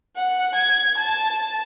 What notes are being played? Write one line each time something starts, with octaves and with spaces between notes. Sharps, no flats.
F#5
G#6
A5